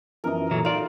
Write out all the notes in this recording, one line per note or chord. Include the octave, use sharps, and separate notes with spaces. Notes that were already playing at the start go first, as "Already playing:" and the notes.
F#2 E3 F3 A#4 D#5
A#2 E3 F#3 A4
D#4 F4 D5